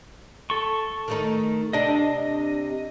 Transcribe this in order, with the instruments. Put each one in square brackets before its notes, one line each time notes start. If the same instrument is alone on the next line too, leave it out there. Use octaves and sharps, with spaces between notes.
[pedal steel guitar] A4 C#6
[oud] D#3 A3 D#4
[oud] C3 D4 [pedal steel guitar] D#5